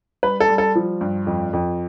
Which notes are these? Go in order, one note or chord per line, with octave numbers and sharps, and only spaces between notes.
G3 B4
A4
G3
A4
F3
G2
F2
F2